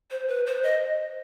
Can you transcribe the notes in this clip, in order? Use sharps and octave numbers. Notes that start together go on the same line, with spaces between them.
C5
B4
C5
D#5